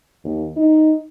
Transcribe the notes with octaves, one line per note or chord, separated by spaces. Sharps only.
D#2
D#4